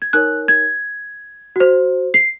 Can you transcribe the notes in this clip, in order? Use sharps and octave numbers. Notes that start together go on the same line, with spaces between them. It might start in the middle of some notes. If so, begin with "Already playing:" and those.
G#6
D#4 A#4 C#5 F#6
G#6
F#4 C5
C7